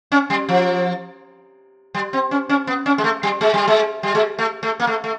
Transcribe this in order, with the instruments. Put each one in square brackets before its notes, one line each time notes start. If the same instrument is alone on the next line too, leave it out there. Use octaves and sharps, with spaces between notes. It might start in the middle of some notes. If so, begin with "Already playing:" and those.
[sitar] C#4
G3
F3
G3
C4
C#4
C#4
B3
C#4
G#3
A3
G3
G#3
G3
G#3
G3
G#3
A3
A3
A#3
A3
A3